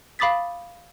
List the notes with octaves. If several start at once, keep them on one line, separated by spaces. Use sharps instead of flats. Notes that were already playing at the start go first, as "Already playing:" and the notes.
F5 B5 D6 D#6 A6 B6